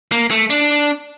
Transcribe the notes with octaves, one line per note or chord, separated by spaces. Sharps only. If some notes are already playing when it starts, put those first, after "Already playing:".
A#3
A3
D4